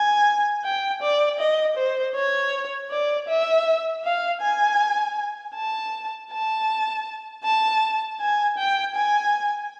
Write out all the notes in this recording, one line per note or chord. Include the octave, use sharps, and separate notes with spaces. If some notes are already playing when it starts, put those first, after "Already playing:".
Already playing: G#5
G5
D5
D#5
C5
C#5
D5
E5
F5
G#5
A5
A5
A5
G#5
G5
G#5